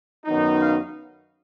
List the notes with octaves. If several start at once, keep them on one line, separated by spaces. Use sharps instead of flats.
F#2 D#3 F#3 B3 D#4
F5